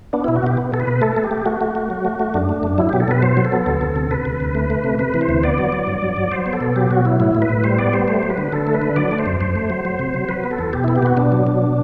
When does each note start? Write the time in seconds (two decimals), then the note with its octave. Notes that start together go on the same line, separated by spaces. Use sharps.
0.13 B3 D4
0.24 B2 E4
0.36 F#4
0.43 B2 G4
0.57 B3
0.72 B2 A4
0.80 B4
0.87 B2
1.01 A3 A4
1.17 A3
1.24 G4
1.31 A3
1.46 A3 F#4
1.61 A3
1.75 A3
1.90 F#3
2.05 A3
2.20 A3
2.34 F#2 D4
2.49 A3
2.63 F#2
2.78 F#3 E4
2.89 B2 G4
3.00 A4
3.08 B2 B4
3.22 F#3 C5
3.37 F#3
3.45 A4
3.52 B3
3.66 D2
3.81 D2
3.96 C3
4.11 C3 B4
4.25 D2
4.40 D2
4.55 A3
4.70 A3
4.84 C3
4.99 C3 B4
5.14 E3
5.21 C5
5.29 D2
5.43 B3 D5
5.58 F#3
5.72 F#3
5.87 G2
6.02 F#3
6.16 F#3
6.32 F#3 C5
6.46 B3
6.53 A4
6.61 B2
6.76 F#3 G4
6.91 B2 F#4
7.05 F#3 E4
7.20 A2 E4
7.35 A2
7.42 B4
7.49 A2
7.64 G3 C5
7.79 B3 D5
7.93 G3 C5
8.08 A3 C5
8.23 F#3
8.30 B4
8.38 D3
8.52 D3 A4
8.67 A3
8.74 B4
8.82 D3
8.96 F#3 D5
9.11 A3
9.19 C5
9.26 F#2
9.41 F#2 C5
9.55 A3
9.70 F#3
9.85 F#3
9.99 C3
10.14 F#3
10.29 F#3 B4
10.44 B3
10.51 A4
10.59 E2
10.73 B2 G4
10.84 B3 E4
10.96 G4
11.03 B2 F#4
11.17 B2 D4
11.32 F#3
11.47 B2